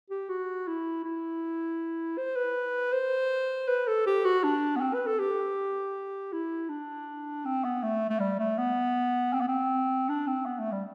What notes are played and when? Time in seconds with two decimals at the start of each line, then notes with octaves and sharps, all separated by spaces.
0.10 G4
0.29 F#4
0.67 E4
1.05 E4
2.18 C5
2.36 B4
2.93 C5
3.68 B4
3.88 A4
4.06 G4
4.25 F#4
4.44 D4
4.76 B3
4.81 C4
4.94 B4
5.06 A4
5.19 G4
6.32 E4
6.69 D4
7.45 C4
7.64 B3
7.83 A3
8.10 A3
8.20 G3
8.39 A3
8.58 B3
9.33 C4
9.41 B3
9.48 C4
10.09 D4
10.27 C4
10.46 B3
10.59 A3
10.72 G3